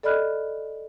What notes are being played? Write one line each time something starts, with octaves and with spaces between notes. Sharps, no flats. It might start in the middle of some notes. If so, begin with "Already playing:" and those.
A4 D5 D#5 B5 F6 F#6